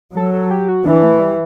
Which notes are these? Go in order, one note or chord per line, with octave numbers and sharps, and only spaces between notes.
F#3 A4
A4
G4
F#4
E3 D4
A3
G3